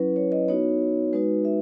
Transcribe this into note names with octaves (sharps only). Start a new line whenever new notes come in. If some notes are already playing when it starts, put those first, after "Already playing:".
Already playing: F#3 C#4 E4 B4
C#5
D#5
B3 D#4 F#4 C#5
G#3 D#4 F#4 B4
E5